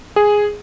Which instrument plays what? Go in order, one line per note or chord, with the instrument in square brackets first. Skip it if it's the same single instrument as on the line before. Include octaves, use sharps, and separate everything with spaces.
[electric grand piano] G#4